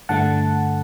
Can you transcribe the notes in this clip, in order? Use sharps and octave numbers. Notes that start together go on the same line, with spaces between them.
G2 D3 A3 F#5 A5